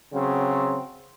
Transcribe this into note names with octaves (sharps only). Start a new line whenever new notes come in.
C#3 F#3 C4